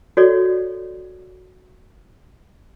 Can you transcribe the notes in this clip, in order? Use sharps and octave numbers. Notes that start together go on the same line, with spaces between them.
F#4 A4 C#5 D5